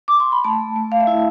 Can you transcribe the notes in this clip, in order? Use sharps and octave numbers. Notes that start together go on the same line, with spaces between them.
D6
C6
B5
A3 A5
A3
F5
E5
E4 F5